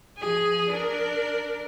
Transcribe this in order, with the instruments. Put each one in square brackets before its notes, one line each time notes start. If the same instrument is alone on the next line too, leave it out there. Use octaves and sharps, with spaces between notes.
[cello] F3 G#4
D4 A#4